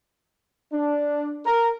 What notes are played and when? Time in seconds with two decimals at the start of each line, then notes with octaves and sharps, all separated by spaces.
0.73 D4
1.45 A#4